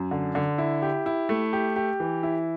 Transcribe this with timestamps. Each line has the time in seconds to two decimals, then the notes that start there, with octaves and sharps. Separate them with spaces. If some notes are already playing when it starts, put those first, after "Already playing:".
Already playing: F#2
0.11 D3
0.35 D3
0.58 E4
0.82 G4
1.06 E4
1.29 A3
1.53 G4
1.76 G4
2.00 E3
2.23 E4